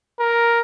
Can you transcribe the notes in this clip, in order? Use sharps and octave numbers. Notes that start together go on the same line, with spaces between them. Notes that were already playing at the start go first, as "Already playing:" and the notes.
A#4